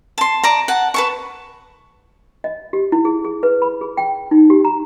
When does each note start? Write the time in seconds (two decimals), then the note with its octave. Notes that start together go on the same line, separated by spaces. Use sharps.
0.18 A5 C6
0.43 D5 A5 A#5
0.68 F#5 A5
0.94 B4 A5 C#6
2.44 D#5
2.73 G4
2.92 E4
3.05 G#4
3.25 G#4
3.43 B4
3.62 B5
3.81 G#4
3.97 G5
4.31 D#4
4.50 G4
4.65 A#5